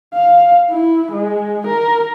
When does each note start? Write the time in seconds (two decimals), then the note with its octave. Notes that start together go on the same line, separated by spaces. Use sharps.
0.14 F5
0.70 E4
1.12 G#3
1.67 A#4